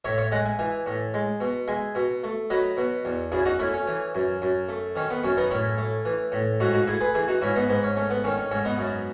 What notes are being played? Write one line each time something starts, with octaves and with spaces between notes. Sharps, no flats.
A2 C#5 E5
C#5 E5
G#3 D#5 F#5
E5 G#5
E3 E5 G#5
A2
G#3
B2
G#3 E5 G#5
B2
A3
F#3 B4 D#5
B2
E2
F#2 E4 G#4
D#4 F#4
A3 C#4 E4
C#4
E3
F#2
F#2
A3
D#3 C#4
B3
F#2 C#4
B3 D#4
A2 C#4 E4
A3
E3
A2
G#2 D#4 F#4
D#4 F#4
A3 E4 G#4
G#4 B4
E3 E4 G#4
D#4 F#4
G#2 C#4 E4
B3 D#4
G#2 B3
C#4
A3 C#4
B3
D#3 C#4
C#4
G#2 C#4
B3 D#4
F#2